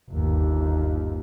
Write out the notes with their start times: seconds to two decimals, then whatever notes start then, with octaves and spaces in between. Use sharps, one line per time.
0.10 G1 D#2